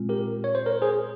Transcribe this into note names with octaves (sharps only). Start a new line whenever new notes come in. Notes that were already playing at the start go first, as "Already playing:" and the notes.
Already playing: A#2 G#3 C4 F4
G4 A#4
C#5
C5
A#4 C#5
G#4 C5